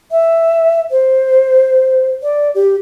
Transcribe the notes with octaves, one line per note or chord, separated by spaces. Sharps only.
E5
C5
D5
G4